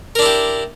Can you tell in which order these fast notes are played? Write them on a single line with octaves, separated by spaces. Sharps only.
A#4 D4 E4 G4